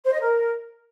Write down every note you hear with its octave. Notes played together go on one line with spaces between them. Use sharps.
C5
D#5
A#4